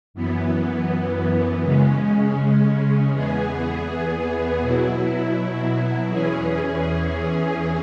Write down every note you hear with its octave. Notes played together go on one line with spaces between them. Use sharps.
F#2 E3 B3
C#3 G#3 C#4
E2 E3 B3 G#4
B2 F#3 E4
E2 E3 C#4 G#4